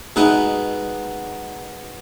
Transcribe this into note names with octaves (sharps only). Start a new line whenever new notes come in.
B2 G#3 D#4 B4 E5